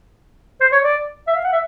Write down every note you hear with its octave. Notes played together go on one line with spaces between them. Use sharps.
C5
C#5
D5
E5
F5
F#5
E5